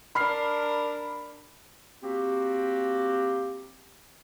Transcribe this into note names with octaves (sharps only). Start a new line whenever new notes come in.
D4 A#4 B5 F6 C7
A#3 C4 F#4 G4